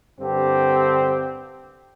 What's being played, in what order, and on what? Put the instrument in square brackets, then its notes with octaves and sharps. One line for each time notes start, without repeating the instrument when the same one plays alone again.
[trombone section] G2 D3 C4 G4